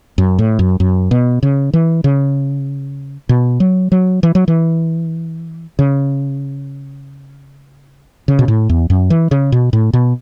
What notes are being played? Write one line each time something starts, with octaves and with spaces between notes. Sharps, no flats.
F#2
A2
F#2
F#2
B2
C#3
E3
C#3
B2
F#3
F#3
E3
F#3
E3
C#3
C#3
B2
A2
E2
F#2
E3
C#3
B2
A2
B2